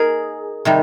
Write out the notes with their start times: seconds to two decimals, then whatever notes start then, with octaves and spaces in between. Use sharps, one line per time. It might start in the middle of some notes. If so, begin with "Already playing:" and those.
Already playing: D#4 G#4 A#4
0.65 C3 D#3 G3